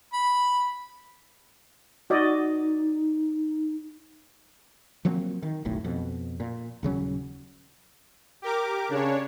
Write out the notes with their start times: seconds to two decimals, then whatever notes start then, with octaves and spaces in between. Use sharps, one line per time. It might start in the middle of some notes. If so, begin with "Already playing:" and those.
0.13 B5
2.10 D#4 F#4 D5 D#5
5.05 F3 F#3 A#3 C4
5.43 D#3
5.65 F1 B1 A2
5.85 F2 B2
6.40 A#2
6.83 D#1 C#3 F#3 C#4
8.42 G4 A#4 D6
8.90 C#3 D4 C#5